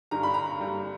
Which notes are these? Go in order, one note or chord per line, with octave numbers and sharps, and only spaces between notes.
G2 D3 G3 A#5
B5
A#5
G2 D3 G3